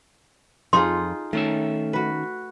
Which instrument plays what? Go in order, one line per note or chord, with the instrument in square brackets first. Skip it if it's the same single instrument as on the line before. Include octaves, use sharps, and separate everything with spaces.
[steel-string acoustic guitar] F2 [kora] D#4 F4 G#4 [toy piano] C6
[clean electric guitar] D#3 C#4 E5 [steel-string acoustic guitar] A3
[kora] F#4 B4